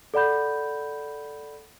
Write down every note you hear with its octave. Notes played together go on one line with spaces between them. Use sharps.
A4 D5 F#5 B5 G6